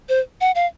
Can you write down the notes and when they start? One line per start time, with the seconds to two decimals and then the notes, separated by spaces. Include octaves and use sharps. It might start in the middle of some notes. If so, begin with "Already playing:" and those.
0.09 C5
0.41 F#5
0.55 F5